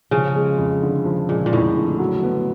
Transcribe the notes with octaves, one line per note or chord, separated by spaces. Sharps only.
C#3 F3
G#3
F2
D3
F3
A#2 G#3
A#2
F2 A2
D3
F#3
B3